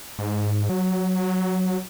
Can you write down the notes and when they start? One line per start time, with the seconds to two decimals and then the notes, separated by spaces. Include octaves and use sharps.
0.19 G#2
0.69 F#3